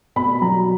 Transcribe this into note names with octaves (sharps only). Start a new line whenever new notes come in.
B2 B5
F#3 A#5